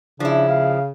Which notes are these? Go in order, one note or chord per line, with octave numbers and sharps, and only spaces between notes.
C#3 F3 D4 E4
F5